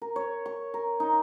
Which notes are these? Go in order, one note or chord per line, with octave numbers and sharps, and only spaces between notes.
A#4
C#5
C#6
A#4
D#4